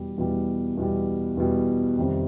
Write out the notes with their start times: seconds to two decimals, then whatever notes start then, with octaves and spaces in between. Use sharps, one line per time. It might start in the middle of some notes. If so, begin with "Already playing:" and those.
Already playing: E2 B2 G3
0.18 E2 B2 G3
0.77 E2 B2 G3
1.37 E2 B2 G3
1.98 F2 C3 D#3 G3